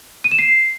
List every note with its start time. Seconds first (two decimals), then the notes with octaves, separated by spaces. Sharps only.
0.24 D#7
0.31 E7
0.39 C7